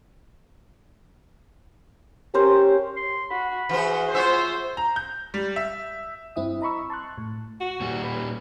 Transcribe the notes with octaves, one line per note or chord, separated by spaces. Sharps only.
C#4 G4 A#4 C5
C6
F#4 B5
E3 F#4 G#4 C5
F4 C5 C#5 E5
A#5
G6
G3
E5
G2 C4 E4 E5 D#6
D#5 A#5 B5 C#6 E6
A5 C6 C#6 F#6
A2
F#4
A#2 G3
B4